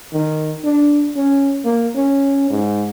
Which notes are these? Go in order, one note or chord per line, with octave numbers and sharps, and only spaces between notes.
D#3
D4
C#4
A#3
C#4
G#2